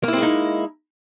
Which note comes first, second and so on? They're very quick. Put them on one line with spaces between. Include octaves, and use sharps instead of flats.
A#3 E4 C4 G#3 D#4